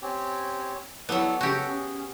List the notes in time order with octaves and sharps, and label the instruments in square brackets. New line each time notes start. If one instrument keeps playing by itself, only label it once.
[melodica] C4 C#4 G4 [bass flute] C#5
[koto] F#3 B3 [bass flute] E4 [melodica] A4 D5 F#5
[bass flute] C#3 [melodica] C#4 A4 F#5 [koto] F#4 G4
[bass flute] C#4 [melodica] G#4